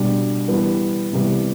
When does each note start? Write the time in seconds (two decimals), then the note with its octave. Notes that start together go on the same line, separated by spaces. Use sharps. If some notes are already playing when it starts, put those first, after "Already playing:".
Already playing: B2 G3 D4
0.48 E3 G3 B3
1.13 C3 E3 G3 B3